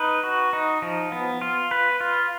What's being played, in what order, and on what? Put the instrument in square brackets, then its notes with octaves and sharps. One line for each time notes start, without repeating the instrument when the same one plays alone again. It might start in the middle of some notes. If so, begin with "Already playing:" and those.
Already playing: [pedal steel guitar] D#4 B4
F#4
D#4
F3
B3
F4
B4
F4